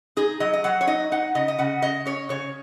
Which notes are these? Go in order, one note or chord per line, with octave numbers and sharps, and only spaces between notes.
D#4 G#4
F#3 D#5
D#5
F#3 F#5
C#5
D#4 D#5
D#4 F#5
C#3 D#5
D#5
C#3 F#5
C#3 D#5
C#4 C#5
C#3 C#5